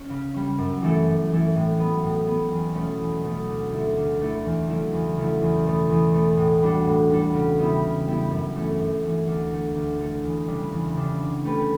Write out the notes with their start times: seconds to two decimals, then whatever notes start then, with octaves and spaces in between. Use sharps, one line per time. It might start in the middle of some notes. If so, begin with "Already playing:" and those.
Already playing: C#4
0.09 C#3
0.34 G3 C#4
0.58 F#2
0.82 E3 A3 E4 A4
1.06 F#2
1.31 E3 A3 E4 A4
1.56 A2
1.79 F#3 B3
2.03 A2
2.27 F#3 B3
2.52 E2
2.75 B2 F#3 A3 C#4
3.00 E2
3.23 B2 F#3 A3 C#4
3.48 D2
3.72 D3 A3 E4 A4
3.97 D2
4.20 D3 A3 E4 A4
4.45 E2
4.69 C#3 F#3 A3 E4
4.93 E2
5.16 C#3 F#3 A3 E4
5.42 E2
5.66 B2 A3
5.90 E2
6.14 B2 A3
6.37 A2
6.62 G3 D4 F#4 A4
6.86 A2
7.10 G3 D4 F#4 A4
7.34 C#3
7.58 G3 B3 E4 G4
7.83 C#3
8.07 G3 B3 E4 G4
8.31 F#2
8.55 E3 A3 C#4
8.80 F#2
9.03 E3 A3 C#4
9.27 D2
9.52 D3 A3
9.76 D2
9.99 D3 A3
10.24 E2
10.47 C#3 G3 D4
10.72 E2
10.96 C#3 G3 D4
11.20 D3
11.44 A3 C#4 G4 B4